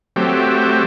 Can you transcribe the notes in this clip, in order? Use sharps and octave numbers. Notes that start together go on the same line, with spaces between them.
F#3 A3 C4 G4